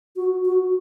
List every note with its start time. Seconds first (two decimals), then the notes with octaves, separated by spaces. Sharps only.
0.16 F#4
0.45 F#4